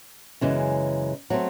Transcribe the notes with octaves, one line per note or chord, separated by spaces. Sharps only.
F#2 C#3 E3 G#3
F#3 A3 C4